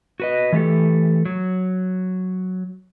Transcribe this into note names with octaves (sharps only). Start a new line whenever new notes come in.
F#4 B4 D#5
E3 A3 G4 A4
F#3